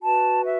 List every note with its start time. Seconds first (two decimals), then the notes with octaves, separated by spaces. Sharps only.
0.01 F#4 B4 A5
0.45 E5